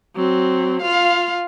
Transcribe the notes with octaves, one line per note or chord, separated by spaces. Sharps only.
F#3 C4
F4 F5